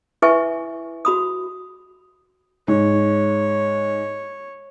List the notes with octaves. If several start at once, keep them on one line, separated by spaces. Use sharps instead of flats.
E4 B4 E5 G#5 C#6
F#4 B5 D#6
G#2 C#5